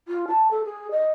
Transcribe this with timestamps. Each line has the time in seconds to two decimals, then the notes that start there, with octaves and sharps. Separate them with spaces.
0.08 F4
0.28 A5
0.51 A4
0.65 G#4
0.91 D#5